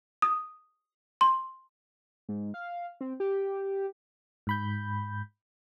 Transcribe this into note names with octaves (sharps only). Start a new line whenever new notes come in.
D#6
C6
G#2
F5
C4
G4
G#2 B5 G6